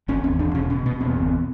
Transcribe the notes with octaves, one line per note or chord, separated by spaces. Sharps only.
G#1 C#4
E2 C4
E1 D4
B2 C#4
B2
B2 B3
E2 C4
B3
G1 C4